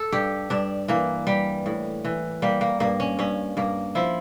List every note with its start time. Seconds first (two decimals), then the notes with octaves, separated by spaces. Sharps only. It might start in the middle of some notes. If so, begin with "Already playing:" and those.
Already playing: A4
0.12 G2 G4
0.50 G2 D4
0.88 E3 A#3
1.27 G3
1.66 A2
2.04 E3
2.42 G3 A#3
2.61 A#3
2.80 G2 A#3
3.00 C#4
3.19 G2 C#4
3.57 G2 A#3
3.95 F3 E4